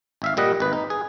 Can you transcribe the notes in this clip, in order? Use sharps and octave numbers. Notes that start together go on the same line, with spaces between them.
G#1 E5 F5
A#2 G3 D#5 F#5
G#1 B4
D#4
G#4